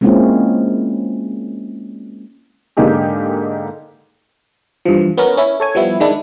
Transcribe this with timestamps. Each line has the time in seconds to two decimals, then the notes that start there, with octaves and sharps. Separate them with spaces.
0.01 G#3 A#3 C4 C#4 E4 F4
2.77 G#2 D3 A#3 D#4 G4 G#4
4.85 G2 E3 F3
5.18 B3 C#4 A#4
5.37 C#4 E4
5.60 A4 C#5 G#5
5.75 F3 G3 B3 E4
6.00 D#3 G#3 D4 E4